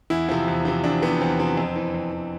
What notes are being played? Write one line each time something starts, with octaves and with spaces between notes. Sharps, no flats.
E2 E4
C3 F3
E2
C3 F3
E2 D4
C3 F3 B3
E2 C4
C3 F3 C4
F2
E3
F2
E3